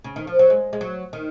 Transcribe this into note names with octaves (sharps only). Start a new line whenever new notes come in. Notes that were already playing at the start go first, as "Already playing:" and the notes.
C#3
D#3
F3
F#3
G#3
G#3
F#3
D#3